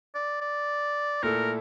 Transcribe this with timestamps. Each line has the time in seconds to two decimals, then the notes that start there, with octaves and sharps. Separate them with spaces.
0.15 D5
0.41 D5
1.23 A#2 A3 E4 A4 A#4